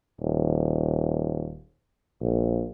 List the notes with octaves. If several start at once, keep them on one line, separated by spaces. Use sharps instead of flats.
D#1
A#1